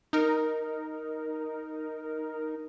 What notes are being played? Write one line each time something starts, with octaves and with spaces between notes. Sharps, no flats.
D#4 A#4